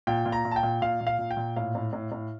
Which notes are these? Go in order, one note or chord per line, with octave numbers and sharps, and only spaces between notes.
A#2 G5
A#2
A#5
A#2
A5
G5
A#2
A#2 F5
A#2
F5
A#2
G5
A#2
A2 F5
A2
A2
A2